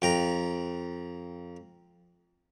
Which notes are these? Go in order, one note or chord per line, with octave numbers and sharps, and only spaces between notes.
F2 G5 A#5